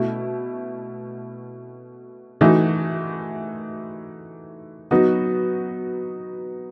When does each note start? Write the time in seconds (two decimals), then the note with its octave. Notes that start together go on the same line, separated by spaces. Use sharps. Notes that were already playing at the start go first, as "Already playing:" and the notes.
Already playing: B2 A3 E4
2.41 E3 A3 D#4 F#4
4.91 F#3 B3 D#4 F#4